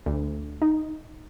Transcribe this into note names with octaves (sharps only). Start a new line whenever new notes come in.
D2
D#4